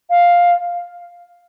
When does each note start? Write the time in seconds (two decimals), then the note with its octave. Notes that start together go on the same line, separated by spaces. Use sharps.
0.10 F5